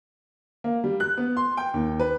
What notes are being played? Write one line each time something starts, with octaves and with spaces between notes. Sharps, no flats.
A#3
G3
F#6
B3
C6
G5
D#2
B4